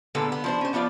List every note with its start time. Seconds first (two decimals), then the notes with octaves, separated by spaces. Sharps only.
0.15 A#2 D3 G#3 A#3 B3 A4
0.32 B3
0.44 F3 D4 C5
0.61 C#4 C5
0.73 F3 B3 D4 F4 D5